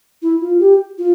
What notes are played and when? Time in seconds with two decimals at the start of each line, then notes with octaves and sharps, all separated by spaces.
0.22 E4
0.41 F4
0.60 G4
0.98 F4